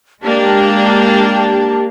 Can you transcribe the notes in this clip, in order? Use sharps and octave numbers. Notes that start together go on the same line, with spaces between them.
G#3 A#3 D4 G4 A5